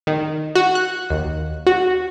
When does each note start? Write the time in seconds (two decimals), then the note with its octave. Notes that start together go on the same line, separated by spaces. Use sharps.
0.07 D#3
0.55 F#4
0.75 F#6
1.10 D#2
1.67 F#4